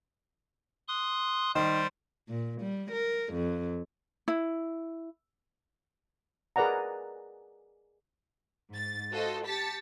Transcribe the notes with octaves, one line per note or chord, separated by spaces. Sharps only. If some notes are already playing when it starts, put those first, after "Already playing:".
C6 D#6 F#6
D#3 G3 C5
A#2
G3
A#4
F2
E4
G#4 A#4 B4 D5 F#5 A#5
G#2 A6
F4 F#4 A4 C5 D#5
G4 A5 A6 B6 C#7